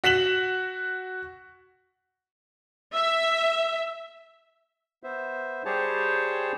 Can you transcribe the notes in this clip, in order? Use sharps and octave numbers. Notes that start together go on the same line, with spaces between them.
F#4 B6 E7 F#7
E5
B3 C5 E5
G3 G4 G#4 C5 C#5 A5